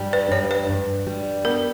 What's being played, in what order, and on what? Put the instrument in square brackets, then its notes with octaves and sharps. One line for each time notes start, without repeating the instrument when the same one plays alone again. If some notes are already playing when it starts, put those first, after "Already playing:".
Already playing: [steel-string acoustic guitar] G2 G3
[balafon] B4
[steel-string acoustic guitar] G2 [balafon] C#5
[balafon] B4
[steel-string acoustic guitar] G2
G3
[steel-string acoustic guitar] B3 [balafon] A#4